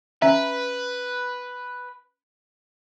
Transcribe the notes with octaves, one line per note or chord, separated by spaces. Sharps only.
C#4 B4 E5 A#5